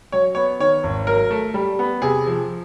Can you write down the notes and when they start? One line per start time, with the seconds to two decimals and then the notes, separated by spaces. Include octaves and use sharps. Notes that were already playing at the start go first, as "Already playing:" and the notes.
0.12 F#3 C#5
0.35 B3 C#5
0.60 D#3 C#5
0.83 G#1
1.07 F#3 A#4
1.31 A3
1.54 G3
1.79 B3
2.02 C3 G#4
2.26 F3